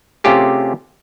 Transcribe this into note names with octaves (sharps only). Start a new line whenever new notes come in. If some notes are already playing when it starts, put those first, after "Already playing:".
C3 A3 C#4 F4 G4 G#4